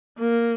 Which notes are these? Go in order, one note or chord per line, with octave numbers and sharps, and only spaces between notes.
A#3